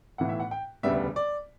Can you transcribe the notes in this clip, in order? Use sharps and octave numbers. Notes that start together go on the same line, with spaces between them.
B1 A2 E3 F#5
E5
F#5
G5
E1 D2 C#3 G3 B3 E5
D5